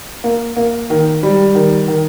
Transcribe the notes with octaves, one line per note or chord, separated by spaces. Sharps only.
A#3
A#3
D#3
G3
D#3
D#3